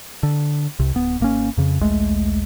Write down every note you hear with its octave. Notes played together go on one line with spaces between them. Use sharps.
D3
C2 C3
D1 B3
G#1 A#3 C#4
F2 C#3
A#1 D#2 G#3 A3